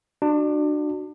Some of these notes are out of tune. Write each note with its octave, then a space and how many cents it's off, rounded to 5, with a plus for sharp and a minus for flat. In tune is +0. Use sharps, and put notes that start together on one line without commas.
D4 +30 F#4 +0